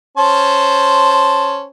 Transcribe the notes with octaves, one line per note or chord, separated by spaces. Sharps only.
C#4 C5 A5